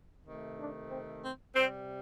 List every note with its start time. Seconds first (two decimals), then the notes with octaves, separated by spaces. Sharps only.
0.25 C3 D#3 A3
0.57 D4
0.90 C4
1.23 C4
1.55 C3 G3 C4